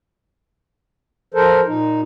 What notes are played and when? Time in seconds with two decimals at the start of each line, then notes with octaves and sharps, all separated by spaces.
1.34 F3 A4 A#4 C5
1.67 A#2 D#4